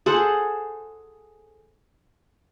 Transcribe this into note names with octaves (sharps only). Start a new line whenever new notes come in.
G#4 A4 C5 F#5